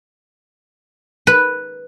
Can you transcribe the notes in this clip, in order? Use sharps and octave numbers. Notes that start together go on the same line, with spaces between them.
B4